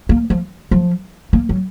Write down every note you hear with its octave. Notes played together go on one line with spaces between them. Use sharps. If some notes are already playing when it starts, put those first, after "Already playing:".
A#3
F3
F3
A#3
F#3